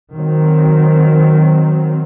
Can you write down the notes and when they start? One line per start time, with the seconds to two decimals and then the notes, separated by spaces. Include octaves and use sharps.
0.13 D#3 F#3 C4